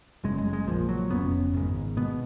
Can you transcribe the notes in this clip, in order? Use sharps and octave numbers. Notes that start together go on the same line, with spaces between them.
F#1 F#2 C#3 G#3
G#3
G#3
A#1 A#2 F3
F#3
F1 F2 C#3 B3
G#1 G#2
B2 B3